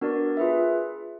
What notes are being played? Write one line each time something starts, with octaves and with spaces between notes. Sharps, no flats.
B3 D4 F#4 A#4 D5
F4 G#4 B4 E5